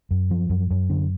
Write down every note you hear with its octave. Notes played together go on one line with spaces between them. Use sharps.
F#2
F3
F#2
F#2
D3